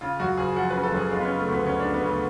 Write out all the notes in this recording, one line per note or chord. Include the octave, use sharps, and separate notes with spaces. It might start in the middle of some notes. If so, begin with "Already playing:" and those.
C#3 F4
F#2 F#4
F#1 G#4
F3 F#5
C#3 B4
A4
F#2
G#4
G#3 F4
B3
C#3 C#4
A3
D2 B3
D2 C#4
G#3 D4
B3
C#3
A3